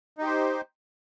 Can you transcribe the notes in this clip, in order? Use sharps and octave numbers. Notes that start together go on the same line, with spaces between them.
D#4 G4 C5